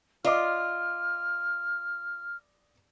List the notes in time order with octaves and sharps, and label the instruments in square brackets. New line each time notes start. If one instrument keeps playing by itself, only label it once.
[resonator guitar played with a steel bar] F4 [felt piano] D5 D#5 D6 [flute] F6